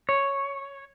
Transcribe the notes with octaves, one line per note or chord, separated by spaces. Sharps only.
C#5